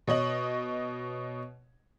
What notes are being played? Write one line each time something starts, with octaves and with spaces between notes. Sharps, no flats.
B2 C#5 D#5 F#7